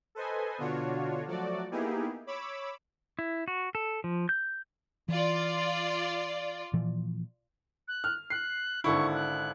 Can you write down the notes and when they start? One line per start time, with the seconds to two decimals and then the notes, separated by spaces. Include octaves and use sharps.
0.15 A4 B4 C5 D#5 G#5
0.58 B2 D3 D4 F4 F#4 C#5
1.27 F3 F#3 A3 F#4 D5
1.71 A#3 B3 D#4 E4 G4 G#4
2.27 C#5 B5 D6 E6
3.19 E4
3.48 F#4
3.75 A4
4.04 F3
4.29 G6
5.08 E3 F4 D5
6.73 A#2 E3 F3
7.88 F#6
8.04 F6
8.30 F#6 C7
8.84 G#1 D3 E4 C#6
9.14 F#6